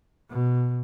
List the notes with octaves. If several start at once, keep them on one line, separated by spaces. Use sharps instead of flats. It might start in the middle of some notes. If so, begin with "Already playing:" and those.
B2